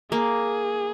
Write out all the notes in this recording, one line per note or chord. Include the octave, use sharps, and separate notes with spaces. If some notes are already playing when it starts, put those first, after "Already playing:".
A#3 G#4